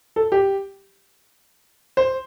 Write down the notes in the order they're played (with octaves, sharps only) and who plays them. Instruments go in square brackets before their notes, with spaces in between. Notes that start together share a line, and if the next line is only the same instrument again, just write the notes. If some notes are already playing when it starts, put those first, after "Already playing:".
[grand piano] A4
G4
C5